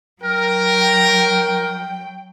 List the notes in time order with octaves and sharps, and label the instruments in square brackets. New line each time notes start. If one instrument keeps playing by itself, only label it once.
[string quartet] F#3 G5 [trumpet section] A#4